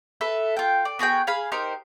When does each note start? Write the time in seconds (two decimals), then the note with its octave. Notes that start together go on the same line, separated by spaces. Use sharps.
0.21 A4 B4 E5
0.57 F4 G5
0.85 D5
0.99 B3 F#4 G#4 G5
1.27 G#4 F5 B5
1.52 D#4 G4 A#4 C5